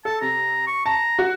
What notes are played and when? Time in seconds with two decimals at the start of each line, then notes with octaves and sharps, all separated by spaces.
0.05 A4 A5
0.21 C3 A#5
0.67 C#6
0.86 A5 A#5
1.19 F#4